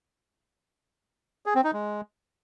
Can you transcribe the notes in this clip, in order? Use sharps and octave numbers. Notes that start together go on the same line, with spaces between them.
G#4
C4
D#4
G#3